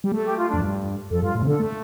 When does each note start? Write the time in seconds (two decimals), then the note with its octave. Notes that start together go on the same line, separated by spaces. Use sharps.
0.04 G3
0.12 A3 A4
0.25 G4
0.38 F4
0.49 D4
0.54 F2
0.61 G2
1.10 F2 A4
1.22 G2 F4
1.35 A2
1.42 C3
1.47 D3 A4
1.60 A3